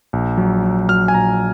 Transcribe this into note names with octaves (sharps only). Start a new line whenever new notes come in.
A#1
F#3
F#3
F#3 F6
G#5
A#1 A#5